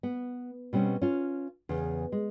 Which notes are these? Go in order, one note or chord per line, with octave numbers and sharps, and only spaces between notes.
B3
B2 G3 C4 C#4
C#4 F4
E2 C#3
G#3